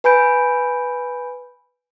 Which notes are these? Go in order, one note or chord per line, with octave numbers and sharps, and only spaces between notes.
B4 G#5 B5 G6 D7